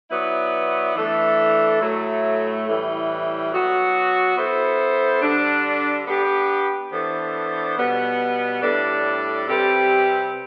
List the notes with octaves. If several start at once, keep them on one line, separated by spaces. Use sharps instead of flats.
F#3 B3 E4 B4 D5
E3 A3 D4 A4
A2 F#3 A3
A2 E3 G3
F#3 B3 F#4
B3 E4 A4 C5
D3 G3 D4
B3 D4 G4 B4
E3 B3 D4 A4 C5
B2 G3 B3
A2 G3 D4 A4 D5
C3 G3 C4 G4 B4